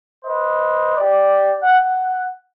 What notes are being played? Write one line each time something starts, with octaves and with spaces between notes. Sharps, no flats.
B4 C5 D#5
G4 D5
F#5